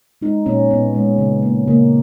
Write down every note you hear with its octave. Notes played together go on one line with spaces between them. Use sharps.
G#3 D#4
A#2 C#4
A#2 B3
G#3
C#3
A#3
C#3 A#3